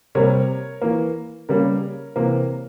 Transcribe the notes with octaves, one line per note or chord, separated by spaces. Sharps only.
C3 G3 A#3 A#4 C#5
E3 A#3
C#3 G3 A#3 A#4 C#5
C3 E3 A#3